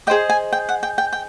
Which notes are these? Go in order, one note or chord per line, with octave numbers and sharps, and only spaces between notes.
G#4 C5 D#5 G5
G#5
G5
F#5
G5
G5
G5